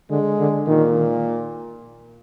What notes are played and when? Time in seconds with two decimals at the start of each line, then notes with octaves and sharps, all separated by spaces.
0.11 D3 G#3
0.39 D3
0.67 A#2 D#3